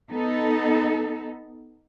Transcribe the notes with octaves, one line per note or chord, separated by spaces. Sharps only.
B3 D#4 A4